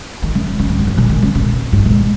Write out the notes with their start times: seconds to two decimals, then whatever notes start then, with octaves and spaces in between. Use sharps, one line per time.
0.22 D#3
0.35 C#3
0.46 D#3
0.59 C#3
0.69 G#2
0.79 F#2
0.87 G#2
0.98 A#2
1.09 D#3
1.22 C#3
1.35 A#2
1.72 G#2
1.85 A#2